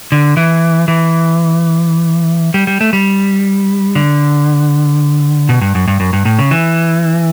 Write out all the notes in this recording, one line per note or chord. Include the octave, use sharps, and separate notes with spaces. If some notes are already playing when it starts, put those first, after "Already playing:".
D3
E3
E3
G3
G3
A3
G3
D3
B2
G2
F#2
G2
F#2
G2
A2
C#3
E3